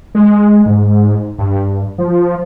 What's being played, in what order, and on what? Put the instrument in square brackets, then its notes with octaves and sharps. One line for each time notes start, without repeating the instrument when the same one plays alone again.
[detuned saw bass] G#3
G#2
G2
F3